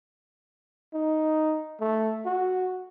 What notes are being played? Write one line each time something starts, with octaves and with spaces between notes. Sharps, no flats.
D#4
A3
F#4